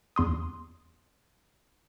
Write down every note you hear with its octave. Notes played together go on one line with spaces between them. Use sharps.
E2 C6 D#6